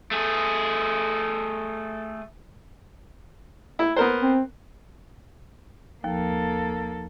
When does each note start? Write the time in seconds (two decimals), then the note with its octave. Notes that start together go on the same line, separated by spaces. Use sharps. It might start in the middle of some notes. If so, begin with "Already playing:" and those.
0.11 A3 G#4
3.79 E4
3.96 B3 A#4 C5
4.22 C4
6.04 D#2 F3 A#3 A4